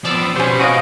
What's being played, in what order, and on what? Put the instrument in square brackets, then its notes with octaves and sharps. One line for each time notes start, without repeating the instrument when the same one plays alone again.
[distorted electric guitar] F3 B3 [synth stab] D5 D6 E6
[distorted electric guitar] B2 [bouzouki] G3 G#5 [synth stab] C#4 C5
[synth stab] F#4 D#6 D7 [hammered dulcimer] C#5 D#5 F5